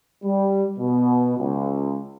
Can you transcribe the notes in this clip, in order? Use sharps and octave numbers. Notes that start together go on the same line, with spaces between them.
G3
B2
C#2